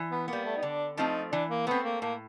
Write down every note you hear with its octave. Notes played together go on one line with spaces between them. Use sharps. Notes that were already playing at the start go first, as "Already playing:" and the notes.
Already playing: E3
B3
G3 A#3 B3
A3
D#4
D3 D4
F3 A3 C4 D#4 F4
E3 D4
A#3
A3 B3 C4
A#3
A2 A#3